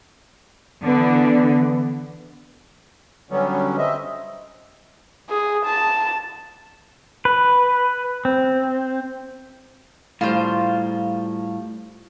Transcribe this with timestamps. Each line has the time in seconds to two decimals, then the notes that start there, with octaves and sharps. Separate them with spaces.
0.85 D3 E3 B3
3.31 D3 F#3 G3 B3 C#4
3.78 C4 D#5 E5
5.30 G#4
5.66 A5
7.25 B4
8.25 C4
10.21 A2 G3 F4 C5